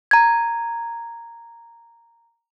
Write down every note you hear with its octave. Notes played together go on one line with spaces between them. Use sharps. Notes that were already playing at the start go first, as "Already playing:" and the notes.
A#5 G#6